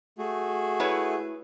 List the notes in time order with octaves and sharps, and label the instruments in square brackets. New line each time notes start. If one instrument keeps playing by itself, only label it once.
[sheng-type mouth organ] A3 F#4 G#4
[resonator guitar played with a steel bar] E4 B4 C#5